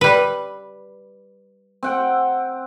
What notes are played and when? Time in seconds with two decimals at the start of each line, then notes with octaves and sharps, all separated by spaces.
0.01 G3 B4
1.83 C4 F#5 G5